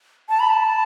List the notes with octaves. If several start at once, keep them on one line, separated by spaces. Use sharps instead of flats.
A5
B5
A5